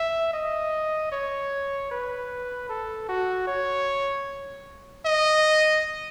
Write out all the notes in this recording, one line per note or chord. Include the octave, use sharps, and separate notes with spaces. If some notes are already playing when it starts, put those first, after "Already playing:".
Already playing: E5
D#5
C#5
B4
A4
F#4
C#5
D#5